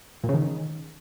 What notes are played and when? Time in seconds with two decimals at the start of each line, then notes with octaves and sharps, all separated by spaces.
0.24 A#2
0.29 C#3
0.34 D#3